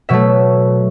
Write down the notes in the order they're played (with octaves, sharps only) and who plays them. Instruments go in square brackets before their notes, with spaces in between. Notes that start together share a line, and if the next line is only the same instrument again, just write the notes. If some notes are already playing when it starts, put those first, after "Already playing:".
[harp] B2 F#3 A3 E5